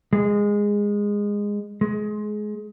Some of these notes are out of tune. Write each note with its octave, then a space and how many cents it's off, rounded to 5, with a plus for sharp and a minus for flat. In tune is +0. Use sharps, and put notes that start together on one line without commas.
G#3 -15
G#3 +20